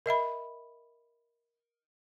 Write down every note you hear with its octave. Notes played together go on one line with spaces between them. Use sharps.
A#4 D#5 E5 B5